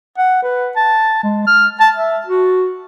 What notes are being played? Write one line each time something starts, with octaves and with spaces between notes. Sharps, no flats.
F#5
B4
A5
G#3
F6
A5
E5
F#4